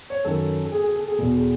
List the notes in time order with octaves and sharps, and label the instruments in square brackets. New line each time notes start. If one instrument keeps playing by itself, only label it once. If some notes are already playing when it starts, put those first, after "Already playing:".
[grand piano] C#5
F#2 D#3 A4
A4
G#4
G#4
A4
G#4
E2 B2 A4
G#4